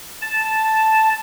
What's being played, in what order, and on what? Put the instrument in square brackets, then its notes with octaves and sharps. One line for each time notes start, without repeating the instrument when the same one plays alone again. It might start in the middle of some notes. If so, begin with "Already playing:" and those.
[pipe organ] A5